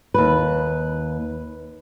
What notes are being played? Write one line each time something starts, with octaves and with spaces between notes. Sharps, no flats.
D#2 B4